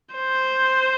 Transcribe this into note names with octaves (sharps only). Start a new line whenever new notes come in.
C5